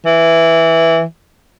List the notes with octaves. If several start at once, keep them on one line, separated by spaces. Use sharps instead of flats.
E3